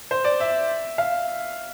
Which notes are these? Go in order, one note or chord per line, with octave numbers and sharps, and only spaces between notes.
C5
D5
E5
F5